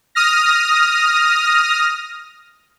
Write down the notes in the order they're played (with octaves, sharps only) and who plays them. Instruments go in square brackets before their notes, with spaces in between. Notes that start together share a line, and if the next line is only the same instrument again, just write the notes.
[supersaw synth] D#6 F6 A#6